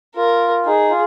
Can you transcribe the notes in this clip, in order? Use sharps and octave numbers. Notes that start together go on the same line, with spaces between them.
F4 A#4
D#4 G#4
F4